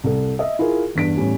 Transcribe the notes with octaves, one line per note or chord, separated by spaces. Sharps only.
C2 A4
D#5 E5
E4 F4 G#4 A#4
E2 G2 B6 D7
E2 A2 G3 C#4